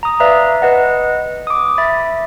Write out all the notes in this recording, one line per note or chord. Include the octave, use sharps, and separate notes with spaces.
A#5 D#6
B4 D5 E5 F5 A#5
B4 D#5 F#5
D6 D#6
E5 B5 A6